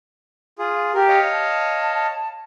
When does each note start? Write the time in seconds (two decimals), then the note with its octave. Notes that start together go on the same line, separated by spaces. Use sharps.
0.59 F4 G#4
0.94 G4 A#4
1.08 C#5 D#5 F5
1.32 A5